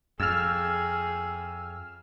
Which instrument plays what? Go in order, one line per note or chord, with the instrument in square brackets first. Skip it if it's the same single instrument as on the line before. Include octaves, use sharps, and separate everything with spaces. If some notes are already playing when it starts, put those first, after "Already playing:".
[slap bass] F2 [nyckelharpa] G#4 [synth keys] E6 F6